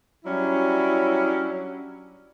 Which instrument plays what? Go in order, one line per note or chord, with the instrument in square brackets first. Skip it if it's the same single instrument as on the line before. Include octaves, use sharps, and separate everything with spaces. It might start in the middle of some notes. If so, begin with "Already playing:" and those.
[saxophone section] F#3 G3 C#4 D4 E4